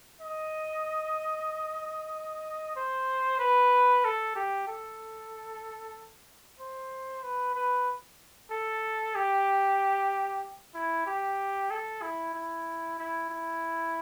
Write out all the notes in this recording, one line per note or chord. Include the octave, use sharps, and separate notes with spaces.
D#5
C5
B4
A4
G4
A4
C5
B4
B4
A4
G4
E4
G4
A4
E4
E4
E4
E4